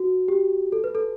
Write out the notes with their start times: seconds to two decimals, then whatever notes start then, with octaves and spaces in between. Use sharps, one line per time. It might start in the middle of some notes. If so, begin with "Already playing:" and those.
Already playing: F#4
0.28 G4
0.72 A4
0.84 B4
0.95 A4